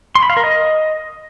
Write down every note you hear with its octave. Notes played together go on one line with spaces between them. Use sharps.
C6
B5
F5
A#4
D#5